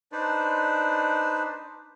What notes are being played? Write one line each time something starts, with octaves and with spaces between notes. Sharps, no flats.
D4 D#4 B4 C5 D5